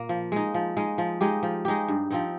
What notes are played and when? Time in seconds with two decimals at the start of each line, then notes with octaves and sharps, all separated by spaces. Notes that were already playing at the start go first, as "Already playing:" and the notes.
Already playing: A#2 A#3
0.09 F3
0.32 G#3 D#4
0.54 F3
0.77 G#3 D#4
0.98 F3
1.21 G#3 D#4 G4
1.43 F3
1.65 G#3 D#4 G4
1.88 G2
2.10 F3 C4 D#4